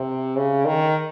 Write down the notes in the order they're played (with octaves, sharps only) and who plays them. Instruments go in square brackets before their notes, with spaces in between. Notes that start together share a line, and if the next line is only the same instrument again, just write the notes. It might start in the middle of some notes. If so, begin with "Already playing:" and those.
Already playing: [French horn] C3
C#3
D#3